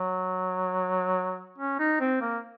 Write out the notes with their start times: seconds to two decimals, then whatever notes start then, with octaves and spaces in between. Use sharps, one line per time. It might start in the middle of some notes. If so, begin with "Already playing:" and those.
Already playing: F#3
1.58 C#4
1.79 D#4
2.00 C4
2.21 A#3